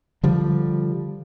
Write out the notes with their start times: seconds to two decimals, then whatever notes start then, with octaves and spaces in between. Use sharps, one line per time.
0.23 D3 F3 G3